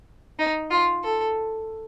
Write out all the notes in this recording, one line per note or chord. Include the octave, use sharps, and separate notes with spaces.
D#4
F4
A4